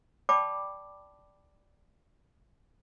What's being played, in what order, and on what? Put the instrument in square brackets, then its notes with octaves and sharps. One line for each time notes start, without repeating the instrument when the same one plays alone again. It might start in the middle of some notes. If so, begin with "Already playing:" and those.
[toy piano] D5 G5 A5 B5 D6